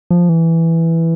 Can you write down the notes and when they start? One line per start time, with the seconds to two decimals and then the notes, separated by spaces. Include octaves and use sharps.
0.11 F3
0.29 E3